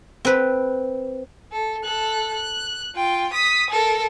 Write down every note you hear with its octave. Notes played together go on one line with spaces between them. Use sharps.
C4 B4
A4
A4 F#6
F#6
F4 G5
D#6 B6
A4 A#4